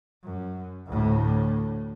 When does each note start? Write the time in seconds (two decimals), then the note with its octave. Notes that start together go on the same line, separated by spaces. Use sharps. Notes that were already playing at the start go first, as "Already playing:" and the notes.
0.24 F#2
0.87 D2 A2